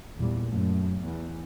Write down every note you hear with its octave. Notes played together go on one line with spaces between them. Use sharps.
E2 A#2 G3
F#2 A3
E2